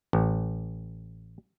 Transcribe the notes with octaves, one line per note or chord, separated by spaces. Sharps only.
A1